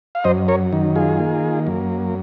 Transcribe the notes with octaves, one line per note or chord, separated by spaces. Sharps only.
F5
F#2 C5 D#5
A#4 C#5
D#3
F4 G#4
A#3
F#2